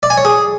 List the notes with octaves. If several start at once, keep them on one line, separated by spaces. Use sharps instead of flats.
D5
G#5
C#5
G#4